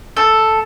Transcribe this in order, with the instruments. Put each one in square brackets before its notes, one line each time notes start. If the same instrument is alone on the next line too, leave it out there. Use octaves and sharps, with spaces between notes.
[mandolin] A4